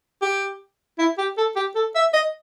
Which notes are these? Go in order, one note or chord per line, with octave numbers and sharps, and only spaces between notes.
G4
E4
G4
A4
G4
A4
E5
D#5